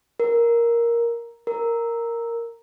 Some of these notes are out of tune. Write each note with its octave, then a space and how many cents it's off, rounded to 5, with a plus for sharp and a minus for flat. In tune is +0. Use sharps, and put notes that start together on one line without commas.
A#4 +5
A#4 -5